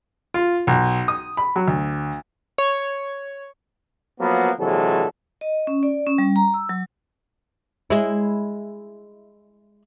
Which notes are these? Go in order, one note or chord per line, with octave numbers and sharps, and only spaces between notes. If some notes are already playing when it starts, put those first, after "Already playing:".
F4
B1
D#6
B5
F#3
D2
C#5
F3 F#3 A#3 B3
A#1 C3 E3 F#3 G#3 A4
D#5
C#4
D5
C#4
G3
A#5
E6
F#3
G#3 E4